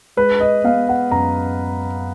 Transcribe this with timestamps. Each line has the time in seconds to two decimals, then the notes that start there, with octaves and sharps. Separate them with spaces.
0.17 G#3 B4
0.40 D#5
0.64 B3 F5
0.89 F#5
1.11 F#2 A#5